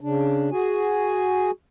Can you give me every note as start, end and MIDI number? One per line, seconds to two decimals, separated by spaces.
0.01 0.50 49
0.01 0.50 62
0.51 1.51 66
0.51 1.51 68
0.51 1.51 80